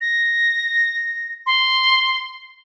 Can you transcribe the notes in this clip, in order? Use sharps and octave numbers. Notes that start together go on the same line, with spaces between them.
A#6
C6